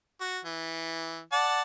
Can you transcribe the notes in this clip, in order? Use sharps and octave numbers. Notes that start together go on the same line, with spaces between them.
F#4
E3
D5 F#5 A5